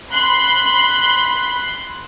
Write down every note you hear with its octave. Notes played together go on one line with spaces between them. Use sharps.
B5 C6 F#6